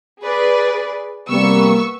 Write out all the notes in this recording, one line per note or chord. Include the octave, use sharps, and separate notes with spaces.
G#4 B4 D5
C3 G3 A#3 B3 C#6 E6